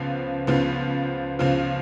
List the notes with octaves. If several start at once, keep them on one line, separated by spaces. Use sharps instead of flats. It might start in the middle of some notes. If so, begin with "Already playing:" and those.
Already playing: C#2 C#3 F3 B3 F4
C#2 C#3 F3 B3 F4
C#2 C#3 F3 B3 F4